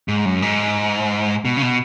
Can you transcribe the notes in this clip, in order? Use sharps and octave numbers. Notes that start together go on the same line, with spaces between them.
G#2
F#2
G#2
B2
C#3
B2